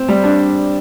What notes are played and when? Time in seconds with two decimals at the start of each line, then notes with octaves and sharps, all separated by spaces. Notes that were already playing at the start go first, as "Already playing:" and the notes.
Already playing: C4
0.09 G3
0.24 D4